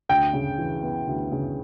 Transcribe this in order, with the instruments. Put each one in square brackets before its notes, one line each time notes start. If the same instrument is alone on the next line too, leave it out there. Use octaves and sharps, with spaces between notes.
[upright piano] D2 [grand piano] G5
[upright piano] C#3
E3
B3
D2
C#3